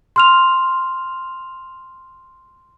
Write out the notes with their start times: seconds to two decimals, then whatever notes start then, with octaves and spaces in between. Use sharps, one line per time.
0.16 C6 F6 F7